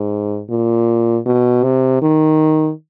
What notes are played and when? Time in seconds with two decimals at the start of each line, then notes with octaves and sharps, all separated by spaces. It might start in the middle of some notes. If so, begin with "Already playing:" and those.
Already playing: G#2
0.50 A#2
1.26 B2
1.64 C3
2.02 D#3